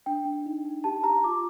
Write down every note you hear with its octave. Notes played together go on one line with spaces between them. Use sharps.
D4 G5
D4
D#4
D#4
G4 A5
G4 A#5
F4 D6